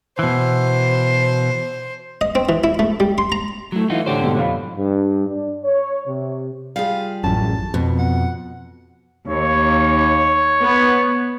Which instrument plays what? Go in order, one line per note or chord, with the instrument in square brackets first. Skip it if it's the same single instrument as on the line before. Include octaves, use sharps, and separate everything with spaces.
[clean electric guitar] B2 E3 [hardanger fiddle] C5
[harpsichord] D#5
C4
E3
E4
A3
G3
C6
A#5
[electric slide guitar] F#3 E4 [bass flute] A3
[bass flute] E3 [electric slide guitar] D#4 F4 F#4
[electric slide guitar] A2 G4 C5 [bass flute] D3 [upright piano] C#5
[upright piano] G#2 B2 G3
[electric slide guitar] F2 F3 [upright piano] C#5 F5 B5
[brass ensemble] G2
D4
C#5
C3
[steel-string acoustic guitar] G3 F4 G#4 [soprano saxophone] F5
[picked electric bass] A1 F#2 [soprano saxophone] A5
[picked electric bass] F2 [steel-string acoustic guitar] B2
[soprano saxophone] F#5
[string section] D#2 [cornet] C#5
[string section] B3